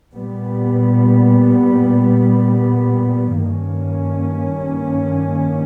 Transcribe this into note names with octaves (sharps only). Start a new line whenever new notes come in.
A#2 G3 B3
G2 D#3 A#3 C#4